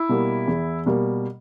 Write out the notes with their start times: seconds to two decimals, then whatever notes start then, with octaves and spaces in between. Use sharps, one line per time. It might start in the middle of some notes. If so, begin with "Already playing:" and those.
Already playing: E4
0.09 B2 G3 A#3
0.47 E2
0.86 B2 G3 A#3